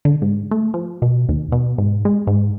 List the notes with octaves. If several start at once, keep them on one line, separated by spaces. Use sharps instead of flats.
D3
G#2
A3
F3
B2
D#2
B2
G#2
G#3
G#2